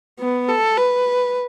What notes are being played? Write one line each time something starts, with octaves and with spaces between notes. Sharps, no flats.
B3
A4
B4